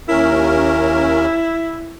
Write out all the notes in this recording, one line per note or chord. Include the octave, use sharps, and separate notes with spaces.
D#2 C#4 E4 A#4